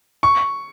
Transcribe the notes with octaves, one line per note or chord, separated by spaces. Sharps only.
C#6